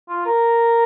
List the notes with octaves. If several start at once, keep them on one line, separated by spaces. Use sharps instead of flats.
F4
A#4